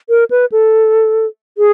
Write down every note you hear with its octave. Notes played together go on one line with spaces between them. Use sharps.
A#4
B4
A4
G#4